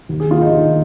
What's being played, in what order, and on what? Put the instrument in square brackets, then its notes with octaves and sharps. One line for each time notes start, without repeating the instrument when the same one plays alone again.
[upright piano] D#2
G#4
A#3 F4
D#4
D#2